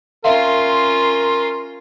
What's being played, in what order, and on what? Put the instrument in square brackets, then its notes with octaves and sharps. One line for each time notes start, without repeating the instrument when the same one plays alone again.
[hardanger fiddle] C#4 F4 [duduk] A#4 [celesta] E5 F5 [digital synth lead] C6